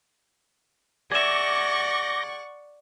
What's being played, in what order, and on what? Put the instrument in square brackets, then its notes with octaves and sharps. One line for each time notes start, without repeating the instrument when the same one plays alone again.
[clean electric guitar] G#4 E5 [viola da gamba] D5 [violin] F#5 C#6 [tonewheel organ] D6 G6 A#6